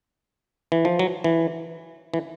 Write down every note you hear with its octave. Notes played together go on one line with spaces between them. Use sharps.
E3
F3
F#3
E3
E3